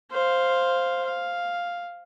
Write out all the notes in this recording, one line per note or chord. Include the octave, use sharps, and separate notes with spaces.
C5 F5
F5